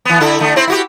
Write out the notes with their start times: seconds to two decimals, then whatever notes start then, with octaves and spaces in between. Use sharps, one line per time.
0.05 E3 B3
0.20 D3 E4 A4
0.40 D3 A3
0.56 C4 E4 C5
0.68 E4 F#4 G4